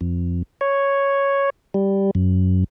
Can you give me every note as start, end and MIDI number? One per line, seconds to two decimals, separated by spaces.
0.01 0.43 41
0.61 1.50 73
1.74 2.11 55
2.15 2.64 42